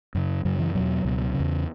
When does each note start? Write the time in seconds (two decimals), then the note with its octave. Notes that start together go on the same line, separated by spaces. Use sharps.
0.15 F#2 C#3
0.45 F#2 C#3 F#3
0.59 E3
0.75 E2 B2 F#3
1.05 C#2 B2
1.34 C#3
1.40 E2